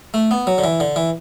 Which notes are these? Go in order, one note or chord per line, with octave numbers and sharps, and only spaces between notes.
A3
B3
F#3
D3
E3
D3
E3